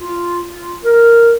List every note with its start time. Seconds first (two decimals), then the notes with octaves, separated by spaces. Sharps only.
0.01 F4
0.48 F4
0.84 A#4